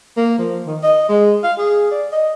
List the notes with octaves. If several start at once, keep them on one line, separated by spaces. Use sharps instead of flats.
A#3
F3
D#3
D#5
G#3
F5
G#4
D5
D#5